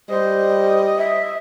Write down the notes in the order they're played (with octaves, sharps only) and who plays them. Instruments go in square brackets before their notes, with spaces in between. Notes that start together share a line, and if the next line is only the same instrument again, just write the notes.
[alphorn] G3 [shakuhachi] C5 [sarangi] D#5
[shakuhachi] E5